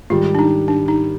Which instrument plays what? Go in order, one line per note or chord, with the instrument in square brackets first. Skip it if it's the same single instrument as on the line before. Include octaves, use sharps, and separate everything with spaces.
[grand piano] G#2 D#3 G3 [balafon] F4
[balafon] D4
D#4
D4
D#4